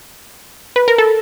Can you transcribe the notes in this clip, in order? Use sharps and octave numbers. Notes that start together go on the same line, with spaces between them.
B4
A#4
A4